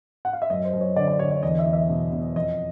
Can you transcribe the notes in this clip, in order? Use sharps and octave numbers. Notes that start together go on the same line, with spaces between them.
F#5
F5
E5
F#2 D#5
C5
F#2
C#5
D3 D5
D5
D3 C#5
C#5
E2 D#5
E5
E2
E5
B2
B2
F2 D#5